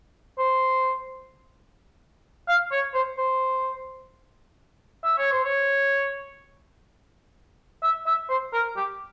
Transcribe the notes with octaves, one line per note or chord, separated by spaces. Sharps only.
C5
F5
C#5
C5
C5
E5
C#5
C5
C#5
E5
E5
C5
A#4
G4